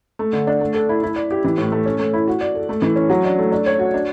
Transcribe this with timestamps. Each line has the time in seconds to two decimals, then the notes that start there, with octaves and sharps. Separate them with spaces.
0.19 A3
0.33 D3
0.47 D4
0.61 A3
0.74 A4
0.89 E4
1.03 E4
1.16 D5
1.31 G4
1.44 E3
1.58 A2
1.72 A3
1.86 C#4
1.99 A3
2.13 E4
2.27 F#4
2.41 D5
2.55 A4
2.69 A3
2.82 E3
2.96 C#4
3.10 F#3
3.25 D4
3.39 A3
3.52 D4
3.66 C#5
3.79 F#4
3.94 D4